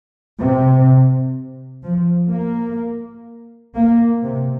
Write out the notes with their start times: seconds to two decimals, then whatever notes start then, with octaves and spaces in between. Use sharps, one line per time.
0.40 C3
1.84 F3
2.31 A#3
3.75 A#3
4.23 C3